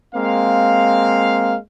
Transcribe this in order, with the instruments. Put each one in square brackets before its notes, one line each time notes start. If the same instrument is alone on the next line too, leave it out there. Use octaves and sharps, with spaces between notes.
[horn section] G#3 A#3 C4 F5